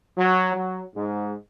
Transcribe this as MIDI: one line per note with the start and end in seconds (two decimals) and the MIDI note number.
0.17 0.52 54
0.54 0.82 54
0.96 1.34 44